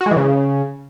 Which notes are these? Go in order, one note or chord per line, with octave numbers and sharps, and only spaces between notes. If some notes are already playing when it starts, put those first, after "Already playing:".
F#4
G#3
E3
C#3